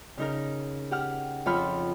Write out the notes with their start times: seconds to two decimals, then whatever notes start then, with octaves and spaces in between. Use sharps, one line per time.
0.17 C#3 D#4 A#4
0.91 G4 F#5 F6
1.46 F2 F3 C#5 B5 F6